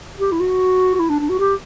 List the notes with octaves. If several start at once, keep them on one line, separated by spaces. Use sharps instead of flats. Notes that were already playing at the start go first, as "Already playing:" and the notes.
G4
E4
F#4
F#4
E4
D4
D4
F#4
G4